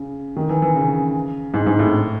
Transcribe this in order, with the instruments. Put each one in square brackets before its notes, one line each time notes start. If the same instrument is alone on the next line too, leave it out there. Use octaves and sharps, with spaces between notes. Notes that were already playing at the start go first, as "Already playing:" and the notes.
Already playing: [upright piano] C#3
D#3
E3
E3
C#3
G#2
G#2
A2